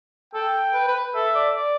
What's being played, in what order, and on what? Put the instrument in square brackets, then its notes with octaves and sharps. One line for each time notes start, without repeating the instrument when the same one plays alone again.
[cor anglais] A4 [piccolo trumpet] G5
[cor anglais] B4
B4
[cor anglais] A4 [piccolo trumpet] E5
[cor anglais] D5
D5